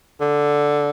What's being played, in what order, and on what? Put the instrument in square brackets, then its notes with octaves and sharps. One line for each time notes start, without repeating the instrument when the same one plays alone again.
[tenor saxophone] D3